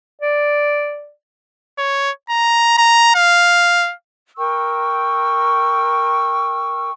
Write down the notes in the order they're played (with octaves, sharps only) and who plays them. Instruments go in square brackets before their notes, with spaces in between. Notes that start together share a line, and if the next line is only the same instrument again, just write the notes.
[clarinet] D5
[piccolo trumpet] C#5
A#5
A#5
F5
[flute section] A#4 G5 C#6 E6